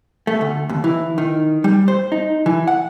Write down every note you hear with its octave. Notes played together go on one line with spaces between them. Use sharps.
A3
D2
D#2
E3
D#3
G3
C5
D#4
E3
F#5